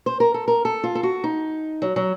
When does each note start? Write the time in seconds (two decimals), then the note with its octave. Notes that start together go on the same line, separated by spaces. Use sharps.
0.06 C5
0.20 A#4
0.34 A4
0.48 A#4
0.65 A4
0.83 F4
0.95 A4
1.03 F#4
1.24 D#4
1.82 F#3
1.96 F#3